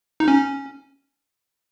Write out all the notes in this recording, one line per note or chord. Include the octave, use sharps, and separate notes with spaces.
D#4
C#4